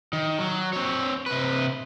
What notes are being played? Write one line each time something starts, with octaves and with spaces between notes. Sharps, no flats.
D#3
F#3
C4 C#5
C3 B4